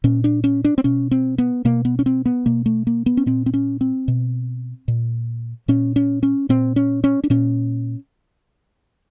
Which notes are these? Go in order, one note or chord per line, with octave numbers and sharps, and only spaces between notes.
A#2 C#4
D4
C#4
D4
C4
B2 C#4
C4
B3
B2 A#3
B3
C#4
C4
B3
B2 A#3
A3
A#3
B3
C#4
A#2 C4
C4
C#4
C4
B2
A#2
A#2 C#4
C#4
C#4
A#2 C4
C#4
C#4
D4
A#2 C#4